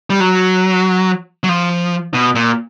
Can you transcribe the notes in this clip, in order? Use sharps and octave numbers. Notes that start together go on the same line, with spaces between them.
G3
F#3
F#3
F3
B2
A#2